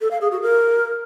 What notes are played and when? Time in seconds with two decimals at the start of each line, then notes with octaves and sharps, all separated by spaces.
0.01 A4
0.11 F5
0.21 G#4
0.31 F#4
0.42 A#4